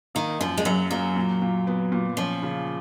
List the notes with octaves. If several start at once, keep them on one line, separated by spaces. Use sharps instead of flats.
D#3 A#3
F#2 F3
G#3
F#2 F#3
F#3 A#3
A#2
A#2
B3
A#2
F3 C#4
C#3